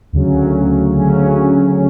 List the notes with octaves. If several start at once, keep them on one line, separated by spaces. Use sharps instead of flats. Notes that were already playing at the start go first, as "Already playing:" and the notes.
D2 C#3 F#3 C#4
D2 C#3 F#3 C#4